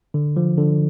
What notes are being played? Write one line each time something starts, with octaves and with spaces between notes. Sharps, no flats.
D3
F3
D3